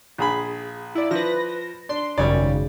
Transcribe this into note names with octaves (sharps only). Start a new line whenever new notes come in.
A#1 G#4 B5
E4 D5
F3 B4 A#6
D4 C6
G#1 F#2 C#3 G3 C#5 D5